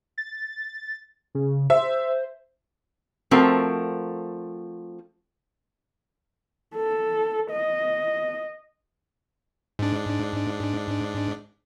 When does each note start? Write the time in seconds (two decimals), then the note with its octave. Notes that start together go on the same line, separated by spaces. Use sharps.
0.18 A6
1.35 C#3
1.70 C5 E5
3.31 F3 A3 C4 F#4 A#4
6.75 A4
7.51 D#5
9.79 G#2 D4